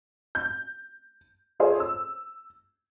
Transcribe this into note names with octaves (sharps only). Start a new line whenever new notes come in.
G6
F4 G#4 A4 C5 C#5
E6